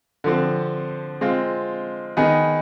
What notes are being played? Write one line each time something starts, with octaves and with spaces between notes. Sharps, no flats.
D3 F3 C4
G#3 C4 F4
D#3 B3 D#4 G#4